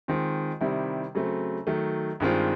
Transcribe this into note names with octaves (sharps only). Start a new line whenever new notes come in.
D#3 G#3 C4 F4
C3 D#3 G3 C4 E4
C#3 F#3 A3 C4
D#3 F#3 A3
G2 D#3 G#3 C4 F4